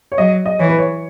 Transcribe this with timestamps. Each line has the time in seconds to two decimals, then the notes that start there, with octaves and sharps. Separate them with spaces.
0.12 C#5
0.18 F#3 D#5
0.46 D#5
0.59 E3 C#5
0.69 B4
0.78 C#5